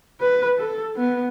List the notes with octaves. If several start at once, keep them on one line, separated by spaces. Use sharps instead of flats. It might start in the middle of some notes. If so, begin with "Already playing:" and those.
B4
A4
B3